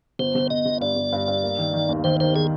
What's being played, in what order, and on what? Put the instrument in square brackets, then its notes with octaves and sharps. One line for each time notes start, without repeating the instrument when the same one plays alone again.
[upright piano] G1 [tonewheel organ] C5
[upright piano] G1
[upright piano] G1 [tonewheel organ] D#5
[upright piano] G1
[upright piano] G2 [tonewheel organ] D5
[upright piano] G1
G2
G2
A#3
D#3
D#3
D#2
[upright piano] D#3 [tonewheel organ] C5
[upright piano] D#3 [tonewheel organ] C5
[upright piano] D#3 [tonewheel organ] G#4